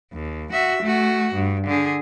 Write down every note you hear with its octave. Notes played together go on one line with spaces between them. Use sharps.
D#2
F#4 E5
A3 F#4
G2
D3 G#4